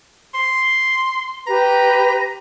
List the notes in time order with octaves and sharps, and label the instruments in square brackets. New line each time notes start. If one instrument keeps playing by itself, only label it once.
[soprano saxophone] C6
[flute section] G4 B4 [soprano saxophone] A#5